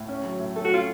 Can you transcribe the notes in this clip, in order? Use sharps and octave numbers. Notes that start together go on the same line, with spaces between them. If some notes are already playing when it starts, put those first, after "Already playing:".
Already playing: A2
C#4
F#3
A2
A3 A4
F#4
C#4 F4